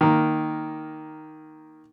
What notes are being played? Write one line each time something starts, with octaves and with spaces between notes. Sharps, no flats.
D#3 A#3